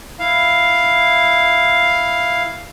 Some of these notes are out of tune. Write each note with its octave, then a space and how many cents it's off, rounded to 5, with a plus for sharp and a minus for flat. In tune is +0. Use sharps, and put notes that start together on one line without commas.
E4 +0 F5 +0